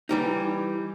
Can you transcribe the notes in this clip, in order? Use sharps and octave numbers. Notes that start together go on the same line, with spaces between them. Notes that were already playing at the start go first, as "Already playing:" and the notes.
E3 G3 D#4